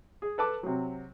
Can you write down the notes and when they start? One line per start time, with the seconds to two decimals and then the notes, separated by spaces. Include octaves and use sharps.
0.22 G#4
0.38 A4 B4 A5 D6
0.63 C3 F#3